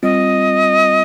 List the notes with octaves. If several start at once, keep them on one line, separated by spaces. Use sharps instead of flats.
G3 C4 F4 D#5